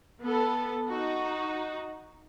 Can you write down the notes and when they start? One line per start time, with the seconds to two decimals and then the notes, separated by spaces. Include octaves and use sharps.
0.22 B3 A4
0.88 D#4 F#4